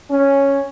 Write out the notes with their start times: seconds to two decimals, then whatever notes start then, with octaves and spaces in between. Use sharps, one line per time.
0.10 C#4